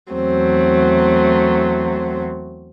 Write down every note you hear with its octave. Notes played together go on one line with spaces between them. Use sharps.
E2 F#3 A3 C4